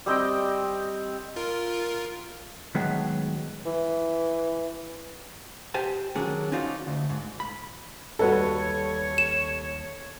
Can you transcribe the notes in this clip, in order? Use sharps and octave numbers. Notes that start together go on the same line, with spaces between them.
G3 C4 D#5 G5
F4 A#4
A2 D#3 F#3 G#3 B3
E3
G4 C5 G#5 A5
D#3 F#3 C#4 D4 G#4 A#4
C#4 D#4 F4 F#4 C5 D5
D2
G#2
B5
D#2 G3 F#4 A4 B4 C#5
E7